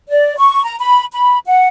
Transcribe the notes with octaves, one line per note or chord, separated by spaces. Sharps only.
D5
C#6
A#5
B5
B5
F#5